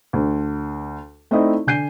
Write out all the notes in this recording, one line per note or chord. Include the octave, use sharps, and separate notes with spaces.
D2
A3 C4 D#4 E4 D5 D#5
D3 G#5 G6 C7 D#7